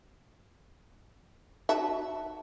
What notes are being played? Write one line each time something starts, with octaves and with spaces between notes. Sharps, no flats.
D#4 F#4 E5 A5